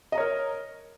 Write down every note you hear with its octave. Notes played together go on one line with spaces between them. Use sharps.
A#4 C#5 D#5 A#5